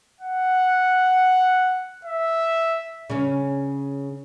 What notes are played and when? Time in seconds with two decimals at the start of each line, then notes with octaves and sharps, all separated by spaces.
0.21 F#5
2.05 E5
3.10 C#3 C#4